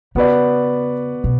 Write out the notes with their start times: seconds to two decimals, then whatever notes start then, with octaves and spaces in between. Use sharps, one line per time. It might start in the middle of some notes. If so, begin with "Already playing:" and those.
0.15 C#3 B3 F#4 B4 D5
1.24 B2